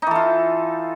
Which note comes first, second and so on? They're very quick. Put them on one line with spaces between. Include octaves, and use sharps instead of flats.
D#4 E3 A4 F4